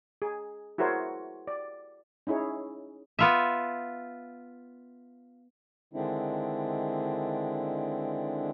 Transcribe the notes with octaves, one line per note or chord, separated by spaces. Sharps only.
G#4
E4 F#4 G#4 A#4 C5 C#5
D5
C#4 D#4 E4 G#4 C#5
B3 F4 E5
D3 D#3 G#3 C4 D4 E4